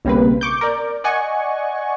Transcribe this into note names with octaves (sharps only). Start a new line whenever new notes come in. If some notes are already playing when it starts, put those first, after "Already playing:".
B1 C#3 G3 A#3 C4 B4
C#6 D6 G6
A#4 D5
D5 D#5 F#5 G#5 C#6